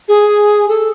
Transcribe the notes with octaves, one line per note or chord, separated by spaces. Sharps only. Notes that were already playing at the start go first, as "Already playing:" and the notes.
G#4
A4